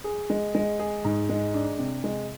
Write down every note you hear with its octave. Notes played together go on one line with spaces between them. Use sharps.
G#4
G#3
G#3
G#4
G#2
G#3
D4
C3
G#3